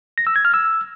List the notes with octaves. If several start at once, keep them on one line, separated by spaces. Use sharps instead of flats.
A#6
E6
G#6
F6
E6